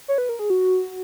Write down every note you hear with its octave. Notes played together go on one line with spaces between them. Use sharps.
C#5
B4
A#4
G#4
F#4